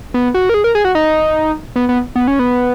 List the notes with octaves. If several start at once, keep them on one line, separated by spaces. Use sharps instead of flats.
B3
F#4
A#4
G#4
A#4
G#4
F#4
D#4
B3
B3
B3
C#4
B3